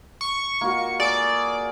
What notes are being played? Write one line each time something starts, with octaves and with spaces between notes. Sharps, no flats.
C#6
A#3 F4 F#4
G#4 D5